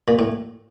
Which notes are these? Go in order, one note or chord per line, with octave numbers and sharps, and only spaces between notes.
A#2
A2